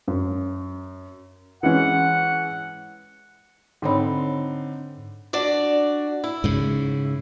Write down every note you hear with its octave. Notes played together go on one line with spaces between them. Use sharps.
F#2
E3 G#3 C#4 F#5
G#2 D3 C4 D#4 C#5 B5
D4 F#4 D5
E4
G#2 C#3